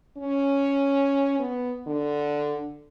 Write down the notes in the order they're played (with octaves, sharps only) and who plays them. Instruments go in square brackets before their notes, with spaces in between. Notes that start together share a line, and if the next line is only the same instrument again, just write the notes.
[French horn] C#4
B3
D3